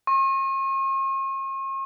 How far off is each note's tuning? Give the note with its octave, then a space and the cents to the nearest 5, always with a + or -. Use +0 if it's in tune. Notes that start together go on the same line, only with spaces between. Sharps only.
C#6 -45